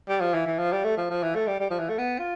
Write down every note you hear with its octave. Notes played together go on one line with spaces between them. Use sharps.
G3
F3
E3
E3
F3
G3
A3
F3
F3
E3
A3
G3
G3
F3
E3
A3
B3
F4